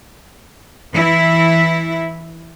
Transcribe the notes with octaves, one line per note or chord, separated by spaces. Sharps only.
E3 E4